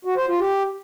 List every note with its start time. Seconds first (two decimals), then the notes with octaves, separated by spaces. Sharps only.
0.05 F#4
0.16 C5
0.28 F4
0.40 G4